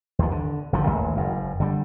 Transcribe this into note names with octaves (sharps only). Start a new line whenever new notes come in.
D#2 F3
D3
G#1 D3 F3
A1 D#2 G#3
F#1 F#2
D3 G3